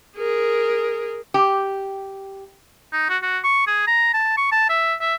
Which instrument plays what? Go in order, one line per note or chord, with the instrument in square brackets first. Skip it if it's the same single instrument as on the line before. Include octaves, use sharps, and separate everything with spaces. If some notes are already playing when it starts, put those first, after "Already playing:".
[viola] G#4 A#4
[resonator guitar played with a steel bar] G4
[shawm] D#4
F#4
F#4
C#6
G#4
A#5
A5
C#6
A5
E5
E5